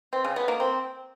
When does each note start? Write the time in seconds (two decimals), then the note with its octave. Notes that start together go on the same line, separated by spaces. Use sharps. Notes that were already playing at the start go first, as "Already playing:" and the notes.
0.13 C4
0.24 C#3
0.36 B3
0.48 A#3
0.60 C4